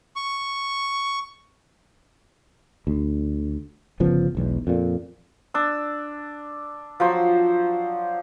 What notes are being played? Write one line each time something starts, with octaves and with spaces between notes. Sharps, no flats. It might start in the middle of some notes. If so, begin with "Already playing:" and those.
C#6
D2
G1 C#3 F3 B3
E1 B1 E2
F2 A#2
D4 E6
F3 F#3 C5